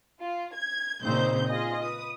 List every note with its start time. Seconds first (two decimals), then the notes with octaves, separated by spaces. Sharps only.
0.20 F4
0.54 G#6
1.03 A#2 C#3 C4 D#4 C5 G6
1.48 F4 G#4 D#5
1.82 B4 D#6